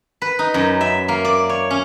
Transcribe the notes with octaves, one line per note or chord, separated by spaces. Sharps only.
B4
D#4
F#2
E5
A#3
D5
C#5
C#4